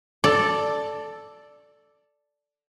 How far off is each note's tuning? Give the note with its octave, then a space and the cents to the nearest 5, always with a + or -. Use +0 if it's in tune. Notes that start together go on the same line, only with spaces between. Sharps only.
A4 +0 D5 +0 A5 +30